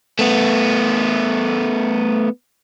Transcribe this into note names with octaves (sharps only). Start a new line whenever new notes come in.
A3 B3